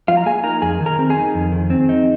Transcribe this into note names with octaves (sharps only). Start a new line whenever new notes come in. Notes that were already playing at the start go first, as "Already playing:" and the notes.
F3 F4 F5
A#5
A#3 G#4 G#5
D#4 A#4 A#5
F2 G#4 G#5
D#3
A#4 A#5
C4
G#4 G#5
D#4
F2
D#3
C4
D#4